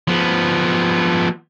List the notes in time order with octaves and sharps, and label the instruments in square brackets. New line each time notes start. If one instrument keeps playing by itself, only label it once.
[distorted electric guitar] F3 B3